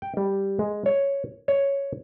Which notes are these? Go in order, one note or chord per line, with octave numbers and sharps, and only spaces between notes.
G5
G3
G#3
C#5
C#5